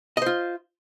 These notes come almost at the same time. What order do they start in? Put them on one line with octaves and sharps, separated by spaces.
D#5 C5 F4